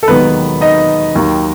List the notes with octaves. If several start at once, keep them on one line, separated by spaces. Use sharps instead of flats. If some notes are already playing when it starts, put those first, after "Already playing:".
A4
E1 D#2 D#3 F#3 B3 B4
D#4 D#5
D#2 D#3 F#3